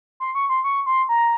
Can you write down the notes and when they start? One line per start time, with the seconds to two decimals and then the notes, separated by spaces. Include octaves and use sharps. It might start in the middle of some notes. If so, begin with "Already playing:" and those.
0.20 C6
0.35 C#6
0.50 C6
0.64 C#6
0.86 C6
1.09 A#5